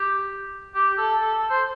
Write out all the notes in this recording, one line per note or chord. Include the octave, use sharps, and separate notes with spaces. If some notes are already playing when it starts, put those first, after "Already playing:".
Already playing: G4
G4
A4
A4
A4
C5